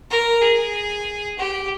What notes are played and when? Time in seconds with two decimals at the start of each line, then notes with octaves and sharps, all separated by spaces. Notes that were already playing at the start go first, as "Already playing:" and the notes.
0.11 A#4
0.42 G#4
1.39 G4